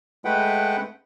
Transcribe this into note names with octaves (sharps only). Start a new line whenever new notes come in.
G#3 A3 B4 F#5 G5